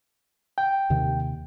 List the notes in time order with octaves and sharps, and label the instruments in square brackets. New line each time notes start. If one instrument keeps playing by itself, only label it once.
[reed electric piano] G5
[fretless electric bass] D#2 C3 D#3